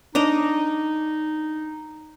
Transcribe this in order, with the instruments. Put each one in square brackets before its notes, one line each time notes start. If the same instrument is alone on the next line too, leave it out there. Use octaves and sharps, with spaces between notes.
[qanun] D4 D#5 A#5 [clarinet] D#4